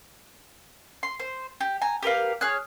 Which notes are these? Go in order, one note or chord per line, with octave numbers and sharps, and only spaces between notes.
C6
C5
G4
G#5 A#5
G4 A#4 B4 F5
G#4 C#5 F6 F#6